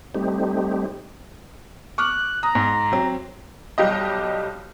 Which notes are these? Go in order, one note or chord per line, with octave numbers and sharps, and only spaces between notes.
G3 A3 C4 D#4 G4
C#6 D6 F6 F#6
A#5 D#6
G#2
F#3 C4
B1 G3 G4 D#5